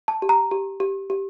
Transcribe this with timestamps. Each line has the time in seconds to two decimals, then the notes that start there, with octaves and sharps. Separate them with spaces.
0.08 A5
0.22 G4
0.29 A#5
0.51 G4
0.80 G4
1.10 G4